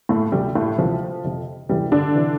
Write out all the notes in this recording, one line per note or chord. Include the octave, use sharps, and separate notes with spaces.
A2 A3
D2 C3 F3 G3
A2 A3
D2 C3 E3 F3
F2 C3 F3
D2 C3 E3 G3
D3 D4
C3 E3